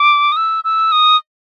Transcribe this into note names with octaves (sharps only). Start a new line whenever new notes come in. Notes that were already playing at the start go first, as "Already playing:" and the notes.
Already playing: D6
D#6
E6
E6
D#6